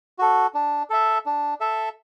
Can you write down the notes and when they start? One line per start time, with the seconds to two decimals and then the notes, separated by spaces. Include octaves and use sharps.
0.19 F#4 A4
0.54 D4
0.90 A4 E5
1.26 D4
1.61 A4 E5